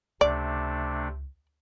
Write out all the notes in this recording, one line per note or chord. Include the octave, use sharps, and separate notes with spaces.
C#2 C3 A3 D4 D5